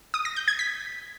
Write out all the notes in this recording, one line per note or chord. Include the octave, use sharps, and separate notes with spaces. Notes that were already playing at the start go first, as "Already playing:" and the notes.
D#6
A#6
G6
G#6
B6